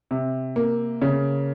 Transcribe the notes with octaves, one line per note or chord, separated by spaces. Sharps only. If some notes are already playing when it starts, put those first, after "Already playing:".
C3
A#3
C#3